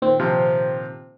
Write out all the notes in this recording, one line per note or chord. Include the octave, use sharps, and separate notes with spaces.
A#2 D#3 C4
C3 F3